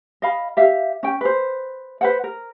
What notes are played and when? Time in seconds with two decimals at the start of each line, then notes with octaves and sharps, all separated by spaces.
0.22 D#5 F5 B5
0.57 G4 E5 F5
1.03 C#4 G5
1.21 B4 C5
2.01 B4 C5 F#5
2.24 A#4